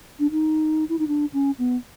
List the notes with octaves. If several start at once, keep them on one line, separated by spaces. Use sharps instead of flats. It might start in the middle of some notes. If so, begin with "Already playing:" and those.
D4
D#4
E4
D#4
D4
C#4
B3